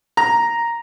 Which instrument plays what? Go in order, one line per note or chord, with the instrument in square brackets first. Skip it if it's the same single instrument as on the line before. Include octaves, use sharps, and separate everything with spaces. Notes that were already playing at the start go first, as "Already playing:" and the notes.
[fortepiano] A#5